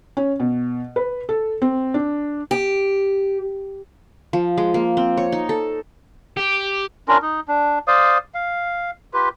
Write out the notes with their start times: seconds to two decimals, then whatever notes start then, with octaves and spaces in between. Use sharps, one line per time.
0.17 C#4
0.40 B2
0.96 B4
1.29 A4
1.62 C4
1.94 D4
2.51 G4
4.33 F3
4.58 G#3
4.74 A#3
4.97 C4
5.17 C#5
5.32 D#4
5.49 A4
6.37 G4
7.08 C#4 D4 F4 A#4
7.22 D#4
7.48 D4
7.88 C5 D5 F5 D#6
8.34 F5
9.14 F4 G4 B4